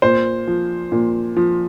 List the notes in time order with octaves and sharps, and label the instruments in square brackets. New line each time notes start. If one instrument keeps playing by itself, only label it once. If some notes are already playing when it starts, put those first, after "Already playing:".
[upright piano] A#2 C5
F3
A#2
F3